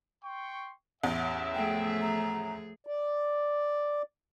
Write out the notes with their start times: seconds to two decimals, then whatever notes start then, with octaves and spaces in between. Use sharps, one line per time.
0.24 G5 C6 C#6
1.04 A1 E2 E5
1.55 F3 A3 G#4 G5
2.01 A#5
2.87 D5